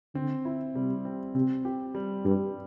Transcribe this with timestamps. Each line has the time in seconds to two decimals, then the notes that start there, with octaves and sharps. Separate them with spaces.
0.15 D3 C4
0.45 E4
0.76 C3 G3
1.05 C4
1.35 C3 C4
1.65 G4
1.95 G3
2.25 G2 G3